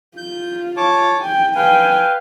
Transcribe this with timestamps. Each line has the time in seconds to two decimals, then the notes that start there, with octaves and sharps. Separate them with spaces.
0.17 F4 G6
0.77 C#5 A5 D6
1.21 G5 G#5
1.55 B4 F5 G5 G#5